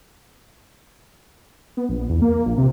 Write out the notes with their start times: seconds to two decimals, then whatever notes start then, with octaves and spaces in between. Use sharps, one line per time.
1.77 B3
1.89 A#1
2.09 E2
2.22 A#3
2.46 A#1
2.57 C3